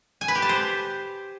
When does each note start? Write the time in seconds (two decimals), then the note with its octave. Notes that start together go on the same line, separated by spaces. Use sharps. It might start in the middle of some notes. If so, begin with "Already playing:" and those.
0.21 G#5
0.28 B4
0.35 G4
0.42 A5
0.49 C5